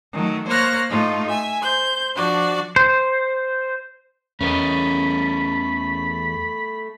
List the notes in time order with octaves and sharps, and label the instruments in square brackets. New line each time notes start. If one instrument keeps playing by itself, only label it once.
[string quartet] D#3 F#3 A3
A#3 C5 C#5 F6 F#6 A#6
A2 A3 D#4 F4
E5 G#5
C5 G6
F3 D4 F#4 D5
[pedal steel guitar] C5
[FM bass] E2 [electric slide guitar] A3 A#4 [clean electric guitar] C#4 B4 D#5 [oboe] B5